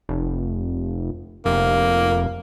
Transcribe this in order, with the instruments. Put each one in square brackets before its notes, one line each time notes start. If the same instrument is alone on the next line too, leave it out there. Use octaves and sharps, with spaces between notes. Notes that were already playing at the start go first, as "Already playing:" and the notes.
[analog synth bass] F1
[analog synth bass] F1 [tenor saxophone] A#3